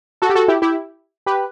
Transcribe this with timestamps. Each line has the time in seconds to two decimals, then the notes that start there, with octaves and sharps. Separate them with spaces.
0.22 F#4 A4
0.30 G4
0.35 F#4 A4
0.48 E4 G4
0.62 E4 G4
1.26 G4 B4